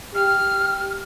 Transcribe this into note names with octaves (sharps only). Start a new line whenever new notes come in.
G4 F6